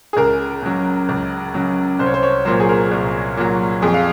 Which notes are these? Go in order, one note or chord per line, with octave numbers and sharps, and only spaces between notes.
G#4
C#2 A#4
C#3 F#3
C#2
C#3 F#3
C2 C5
C#5
C5
C#5
A#2 F#3 C5
G#4
A#4
C2
A#2 F#3
F2 G#4
F5